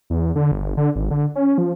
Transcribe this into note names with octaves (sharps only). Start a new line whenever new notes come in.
E2
D3
G1
D3
G#1
D3
C#4
F3